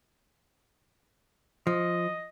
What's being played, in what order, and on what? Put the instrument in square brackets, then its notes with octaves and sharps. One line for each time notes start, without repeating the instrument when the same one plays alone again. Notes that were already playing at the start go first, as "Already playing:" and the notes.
[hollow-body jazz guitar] F3 [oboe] D#5